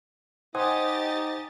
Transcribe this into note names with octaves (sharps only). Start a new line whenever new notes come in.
D#4 G4 C5 D#5 F#5 G#5 D#6 A6